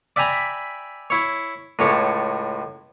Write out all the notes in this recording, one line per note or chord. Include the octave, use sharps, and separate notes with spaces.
D5 E5 G5 G#5 A#5 B5
E4 C#5
C#2 A2 C#5 A5